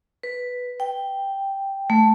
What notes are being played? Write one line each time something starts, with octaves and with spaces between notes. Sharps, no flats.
B4
G5
A3